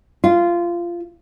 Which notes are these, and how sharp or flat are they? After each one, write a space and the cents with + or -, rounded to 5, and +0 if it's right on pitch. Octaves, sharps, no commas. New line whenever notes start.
F4 -15